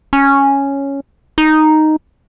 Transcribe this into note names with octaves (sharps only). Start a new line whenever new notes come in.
C#4
D#4